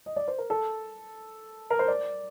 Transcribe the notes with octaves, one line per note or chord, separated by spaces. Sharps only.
D#5
D5
C5
A#4
A4
A#4
C5
D5